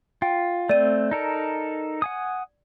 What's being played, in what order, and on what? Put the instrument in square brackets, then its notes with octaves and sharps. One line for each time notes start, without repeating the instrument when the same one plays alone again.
[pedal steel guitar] F4 [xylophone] G5
[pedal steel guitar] A3 C4 [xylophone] D5 D#7
[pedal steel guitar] D#4 A4 A#4
F#5 G#5 D#6